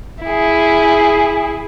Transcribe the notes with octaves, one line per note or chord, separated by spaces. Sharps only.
E4 G#4